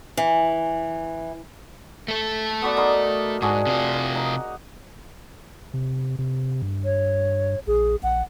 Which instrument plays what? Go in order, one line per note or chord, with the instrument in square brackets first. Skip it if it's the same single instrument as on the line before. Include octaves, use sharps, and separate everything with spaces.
[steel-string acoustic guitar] E3
[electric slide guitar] A3 A4
[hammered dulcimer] B3 F#4 D5
D#4 A#4 C6
[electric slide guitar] G#2 [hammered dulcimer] D4 F#4 G#4
[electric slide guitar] C3 F4
[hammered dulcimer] D#4
[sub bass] C3
C3
G2
[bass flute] C#5
[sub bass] A#1 [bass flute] G#4
[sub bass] A#1 [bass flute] F#5